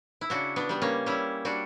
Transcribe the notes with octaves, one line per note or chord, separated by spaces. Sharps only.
E4
C#3 D4 F#4
B3 D4
G3 B3
A#3 C#4
G3 C#4 E4
G3 D4 F#4